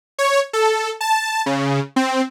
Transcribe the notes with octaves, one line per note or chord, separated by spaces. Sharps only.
C#5
A4
A5
C#3
C4